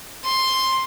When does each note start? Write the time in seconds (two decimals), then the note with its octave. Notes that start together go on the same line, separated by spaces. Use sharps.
0.24 C6